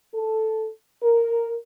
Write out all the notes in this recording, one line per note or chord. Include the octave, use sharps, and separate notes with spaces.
A4
A#4